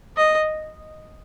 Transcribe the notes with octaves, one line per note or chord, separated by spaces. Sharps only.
D#5